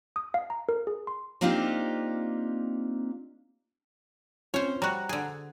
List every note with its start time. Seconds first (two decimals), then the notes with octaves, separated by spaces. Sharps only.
0.16 D#6
0.34 F5
0.50 A#5
0.69 A#4
0.87 G#4
1.07 C6
1.41 A#3 C4 D4 D#4 F4 G4
4.54 C4 C#4 F4 C5 C#5
4.82 G3 F#4 A#5 F#6
5.09 D3 G#4